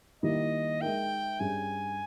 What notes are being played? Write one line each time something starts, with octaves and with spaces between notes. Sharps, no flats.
D#3 G3 A#3 E4 G4 D#5
G#3 D#4 A#4 E5 G5
G2 G3 C#4 G#4 G#5